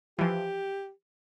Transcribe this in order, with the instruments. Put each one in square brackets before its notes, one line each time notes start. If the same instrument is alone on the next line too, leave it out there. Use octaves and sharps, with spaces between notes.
[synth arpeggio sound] E3 F3 [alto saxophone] G4